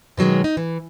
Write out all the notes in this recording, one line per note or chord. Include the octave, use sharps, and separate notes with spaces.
B2 D#3 F#3 G#3 C#4
D#4
E3